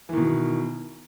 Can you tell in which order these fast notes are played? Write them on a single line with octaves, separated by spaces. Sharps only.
E3 D#3 B2